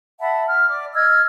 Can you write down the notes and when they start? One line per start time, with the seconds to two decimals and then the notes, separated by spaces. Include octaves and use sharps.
0.20 E5 F#5 A5 B5
0.47 F6
0.69 D5 D6
0.94 D#5 E6 F6 G#6